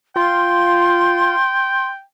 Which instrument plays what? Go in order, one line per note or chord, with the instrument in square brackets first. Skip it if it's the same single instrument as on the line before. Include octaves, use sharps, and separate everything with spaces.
[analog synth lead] F4 [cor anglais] G5 [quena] C6